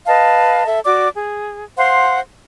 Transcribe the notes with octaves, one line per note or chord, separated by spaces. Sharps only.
B4 D#5 F5 A5
A4 E5
F#4 D5 D6
G#4
C5 F5 F#5 C6